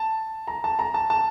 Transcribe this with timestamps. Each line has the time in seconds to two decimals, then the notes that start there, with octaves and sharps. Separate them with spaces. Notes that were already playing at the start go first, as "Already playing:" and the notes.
Already playing: A5
0.47 A#5
0.64 A5
0.79 A#5
0.94 A5
1.10 A5